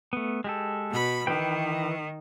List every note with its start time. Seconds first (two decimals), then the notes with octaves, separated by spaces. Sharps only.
0.13 A3 B3
0.44 G#3 G4 A4
0.89 B2 B5
1.27 D#3 E3 B4 G5